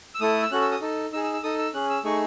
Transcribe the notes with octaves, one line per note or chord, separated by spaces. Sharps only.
E6
A3 E4 A4 D#6
E6
C#4 F#4 A4 F#6
E6
D#6
D#4 A4
D#4 G#4 E6
E6
E6
D#4 A4 D#6
E6
C#4 G#4 F#6
E6
A3 D#4 G#4 C#6